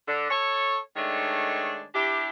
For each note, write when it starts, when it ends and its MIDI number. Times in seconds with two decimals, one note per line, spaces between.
0.07 0.28 50
0.30 0.76 69
0.30 0.76 73
0.96 1.82 51
0.96 1.82 56
0.96 1.82 57
0.96 1.82 62
0.96 1.82 73
1.94 2.30 62
1.94 2.30 64
1.94 2.30 67